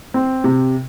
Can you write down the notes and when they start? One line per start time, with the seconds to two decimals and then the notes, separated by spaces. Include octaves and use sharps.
0.14 C4
0.44 C3